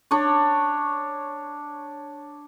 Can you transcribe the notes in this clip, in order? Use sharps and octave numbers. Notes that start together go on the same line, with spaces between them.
D4 C#5